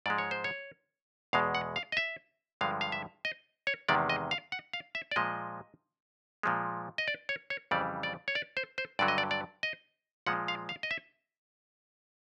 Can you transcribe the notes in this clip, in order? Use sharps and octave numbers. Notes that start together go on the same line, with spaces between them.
G#2 F3 G#3 D5
C#5
C5
C#5
E2 B2 G#3 F5
F#5
F5
D#5
E5
G2 D3 F3 G#3 F5
F5
E5
D#5
C#5
E2 C3 D#3 G#3 D5
D#5
F5
F#5
F5
E5
D5
A#2 F3 G#3 D#5
A#2 F3 G#3
D#5
D5
C#5
C#5
F2 C#3 E3 G3 D5
D5
C#5
D5
C5
C5
G2 D3 F#3 D5
D#5
D5
D5
D#5
A#2 F3 G#3 F#5
F5
F5
D#5
E5